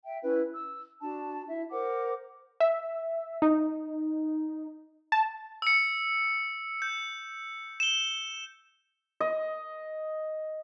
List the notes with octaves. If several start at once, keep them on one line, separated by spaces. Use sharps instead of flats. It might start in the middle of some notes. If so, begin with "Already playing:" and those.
E5 G5
C#4 E4 B4
E6
D4 F#4 A5
E4 E5
A#4 C5 F#5 D6
E5
D#4
A5
E6 C#7
G6
E7 G7
D#5